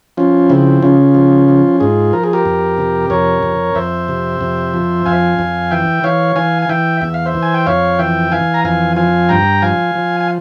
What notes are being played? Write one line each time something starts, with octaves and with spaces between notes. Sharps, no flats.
F3 C#4 F4
C#3 C4 E4
C#3 C#4 F4
F3
F3
G#2 F4 G#4
F3 A#4
G#4
G4 A#4
F2
C3
F2 A#4 C#5
F2
F2 C5 E5
C3
F2
F3
F2 F5 G#5
F2
E3 E5 G5
E3 C#5 F5
E3 F5 G#5
G#5
E3 E5 G5
E2 E5
F5
C5 E5
E3
G#5
G5
F2 C#5 F5
E3 E5 G5
E3 F5 G#5
A#5
F2 F5 G#5
F3 F5 G#5
G2 G5 A#5
F3 F5 G#5
F3
G#5